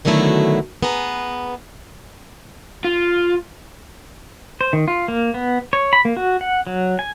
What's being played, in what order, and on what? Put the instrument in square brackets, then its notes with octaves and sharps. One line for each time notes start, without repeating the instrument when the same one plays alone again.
[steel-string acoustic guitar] B2 D3 D#3 F#3 A3 E4
B3 G#4 B4 A#5
[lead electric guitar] F4
[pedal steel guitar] C5
D#3
F4
A#3
B3
C#5
B5
A#3
F#4
F#5
F#3
G#5